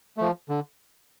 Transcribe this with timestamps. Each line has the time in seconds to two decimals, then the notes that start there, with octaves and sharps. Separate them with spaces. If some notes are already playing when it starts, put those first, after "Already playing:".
0.17 F3 A3
0.49 D3